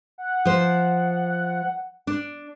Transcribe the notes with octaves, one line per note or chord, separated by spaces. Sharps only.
F#5
F3 C5
D4